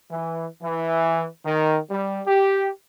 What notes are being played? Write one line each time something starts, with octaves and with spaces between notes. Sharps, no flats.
E3
E3
D#3
G3
G4